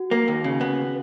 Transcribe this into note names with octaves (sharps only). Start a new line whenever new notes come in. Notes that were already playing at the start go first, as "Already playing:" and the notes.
Already playing: F#4
A#3
D#2
C#3
B3